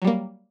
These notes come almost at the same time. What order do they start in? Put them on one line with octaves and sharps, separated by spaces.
F#3 G3 A#3